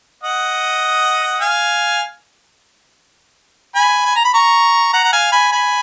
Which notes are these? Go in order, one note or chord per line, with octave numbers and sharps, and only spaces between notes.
D#5 F#5
F5 G#5
G#5 B5
G#5
A#5
B5
A#5 C#6
F#5 A#5
F#5
F5 G#5
G#5 B5
G#5 B5